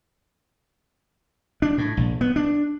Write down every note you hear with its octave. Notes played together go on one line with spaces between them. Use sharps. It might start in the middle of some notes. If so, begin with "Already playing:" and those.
D4
A2
A#1
B3
D4